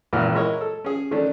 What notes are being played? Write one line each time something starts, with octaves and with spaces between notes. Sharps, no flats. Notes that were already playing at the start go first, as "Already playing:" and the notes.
G#1 C#2 A#2 E3 F#5 F6
G#3 E4 A#4 C#5 D#5
A4
C#4 G#4
D#3 A3 C#4 D4